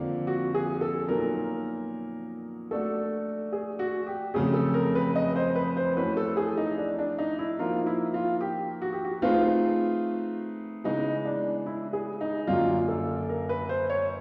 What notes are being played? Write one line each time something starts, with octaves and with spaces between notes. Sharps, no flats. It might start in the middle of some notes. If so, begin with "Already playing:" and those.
Already playing: F2 D3 F3 A#3
F#4
G#4
A4
A#2 F#3 B3 D#4 A#4
A3 D4 F#4 A4
G#4
F#4
G4
F2 C#3 F#3 A3 G#4
A4
A#4
B4
D#5
C5
B4
C5
E3 A3 C#4 F#4 B4
A4
G#4
D#4
D4
D4
D#4
E4
F3 A#3 D#4 F4 F#4 A#4
E4
F4
G4
F#4
G4
F#4
A3 C4 D#4 F4 G#4 B4
C#3 E3 G#3 B3 D#4
D4
E4
G#4
D#4
F#2 D3 F#3 A#3 F4
A4
A#4
B4
C5
C#5